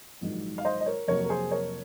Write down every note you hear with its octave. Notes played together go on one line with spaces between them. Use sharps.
A#1 G#2 D#3 F#3
F5
C5 D#5
D#5
A#4 C#5
F2 C3 F#3 A#3 A#4 C#5
A#4
G#4 C5
A#4 C#5